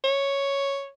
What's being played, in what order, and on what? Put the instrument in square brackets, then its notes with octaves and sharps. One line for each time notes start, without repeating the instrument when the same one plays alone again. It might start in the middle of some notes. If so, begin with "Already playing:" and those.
[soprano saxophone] C#5